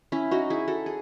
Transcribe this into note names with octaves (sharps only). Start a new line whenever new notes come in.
C#4 E4
D#4 F#4
E4 G#4
F#4 A4
G#4